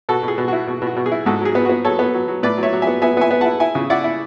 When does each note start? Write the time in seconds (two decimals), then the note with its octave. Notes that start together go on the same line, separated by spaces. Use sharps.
0.09 B2 F#4 A4
0.23 B2 G#4
0.38 B2
0.48 E4 F#4
0.67 B2
0.82 B2
0.87 F#4
0.96 B2
1.06 G#4
1.12 E4
1.26 G#2 F#4 A4
1.41 F#3 G#4
1.55 B3
1.65 B3 F#4
1.85 F#3 A4 C#5
1.99 B3
2.14 F#3
2.28 F#3
2.43 A2 B4 D5
2.58 F#3
2.63 C#5 E5
2.73 F#3
2.82 E5 G#5
2.87 B3
3.02 B3 E5 G#5
3.17 B3 E5 G#5
3.31 B3
3.41 E4 F#5 A5
3.60 E4 E5 G#5
3.75 C#3
3.90 E4 D5 F#5
4.04 E4